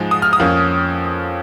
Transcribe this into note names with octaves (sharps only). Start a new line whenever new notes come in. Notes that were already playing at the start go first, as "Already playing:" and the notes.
Already playing: G#2 F3 G#3
D#6
F6
D#6
F2 F3 A#3 C#4